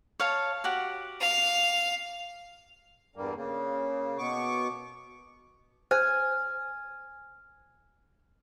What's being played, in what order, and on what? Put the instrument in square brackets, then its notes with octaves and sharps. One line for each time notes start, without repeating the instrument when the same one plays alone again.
[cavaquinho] C#5 F5 A5
F#4 G4 F#5
[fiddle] F5
[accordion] E2 G2 G3 A#3
C#3 A#3
B2 B3 C#6 D6
[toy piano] C5 [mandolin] G#5 [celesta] F6